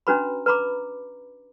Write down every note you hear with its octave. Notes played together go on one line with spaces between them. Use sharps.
C#4 D4 F#4 B4 A#5 B5
B4 A#5 B5 D6